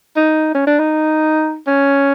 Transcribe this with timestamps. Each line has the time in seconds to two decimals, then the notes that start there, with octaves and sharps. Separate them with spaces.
0.17 D#4
0.55 C#4
0.67 D4
0.79 D#4
1.67 C#4